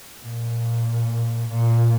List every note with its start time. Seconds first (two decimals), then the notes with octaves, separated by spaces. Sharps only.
0.21 A#2
1.50 A#2